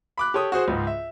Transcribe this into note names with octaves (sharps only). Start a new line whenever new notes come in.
B5 D6 F#6
G4 A4 C#5 D#6
F#4 G#4 C5
C#2 G#2
E5